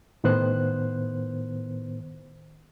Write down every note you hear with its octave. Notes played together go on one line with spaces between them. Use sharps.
A2 D#3 B3 C5 F#6